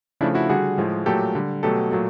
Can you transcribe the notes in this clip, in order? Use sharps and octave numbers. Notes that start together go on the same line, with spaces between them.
C#3 F3 A3 D4 E4
E4 F#4
D3 G3 F#4 G#4
A2 F3 G#3
A#2 F#3 A3 G4 A4
D3 G3
B2 F#3 A3 G4 A4
A#2 F#3 A3